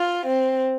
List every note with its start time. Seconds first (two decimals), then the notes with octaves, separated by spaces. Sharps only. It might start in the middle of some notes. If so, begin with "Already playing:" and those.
Already playing: F4
0.25 C4